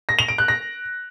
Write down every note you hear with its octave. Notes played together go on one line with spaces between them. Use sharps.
A#6
F7
D7
F#6
A#6